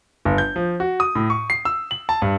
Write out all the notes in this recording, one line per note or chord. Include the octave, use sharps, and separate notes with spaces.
G1
G6
F3
F#4
D#6
A2
C#6
C7
E6
F#7
A5
G2